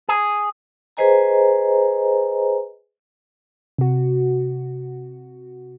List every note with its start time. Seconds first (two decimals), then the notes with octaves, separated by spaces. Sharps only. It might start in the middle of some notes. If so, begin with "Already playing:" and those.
0.09 G#4
0.97 G#4 B4 C5 D#5 G#5 A#5
3.78 C3 F#4